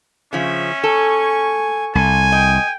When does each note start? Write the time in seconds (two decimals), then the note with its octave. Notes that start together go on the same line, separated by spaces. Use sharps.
0.33 C#3 F3 C#4 E5
0.84 A4 G#5 C#6
1.95 C2 A4 G#5
2.32 D#5 G5